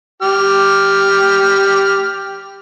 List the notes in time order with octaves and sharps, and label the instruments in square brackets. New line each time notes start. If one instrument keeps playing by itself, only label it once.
[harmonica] G4 F6